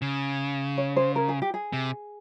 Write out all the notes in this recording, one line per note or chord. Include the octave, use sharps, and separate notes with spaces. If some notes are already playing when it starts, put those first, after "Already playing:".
C#3
C#5
C5
A#4
G#4
G4
G#4
C3